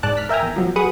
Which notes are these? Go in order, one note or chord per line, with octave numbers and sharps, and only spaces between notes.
G#2 D5 A5 F#6
F6 B6
A#4 E5 G5 G#5 A#5
E2
F3 F#3
F#4 G#4 B4 F#5 D#6